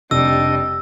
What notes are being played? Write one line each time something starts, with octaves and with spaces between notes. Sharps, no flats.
F1 G3 D4 D#5 E6